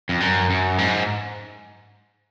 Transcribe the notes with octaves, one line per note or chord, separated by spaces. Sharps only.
F2
F#2
F#2
G#2